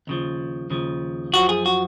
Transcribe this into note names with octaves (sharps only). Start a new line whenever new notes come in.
D#2 C#3 F3
D#2 C#3 F3
F#2 F3 F#4
G#4
F#4